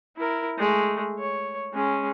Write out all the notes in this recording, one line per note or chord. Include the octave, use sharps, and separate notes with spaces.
E4 A#4
G#3 A3
C#5
G#3 C#4